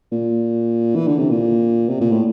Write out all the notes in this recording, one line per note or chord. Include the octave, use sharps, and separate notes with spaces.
A#2
E3
D3
C3
A#2
C3
A#2
A2